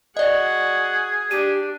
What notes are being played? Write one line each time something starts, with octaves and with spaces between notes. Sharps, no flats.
F#4 G#4 D5 D#5 F#5
D4 G4 D#7